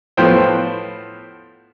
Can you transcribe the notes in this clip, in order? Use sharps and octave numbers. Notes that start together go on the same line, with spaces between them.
A2 F3 B3 C5 G5